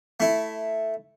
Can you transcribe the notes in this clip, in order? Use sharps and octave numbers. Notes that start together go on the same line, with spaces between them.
A3 E4